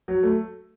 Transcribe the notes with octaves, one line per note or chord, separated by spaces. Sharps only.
F#3
A3